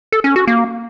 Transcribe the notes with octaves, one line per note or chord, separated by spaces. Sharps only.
A4
C#4
F#4
A#3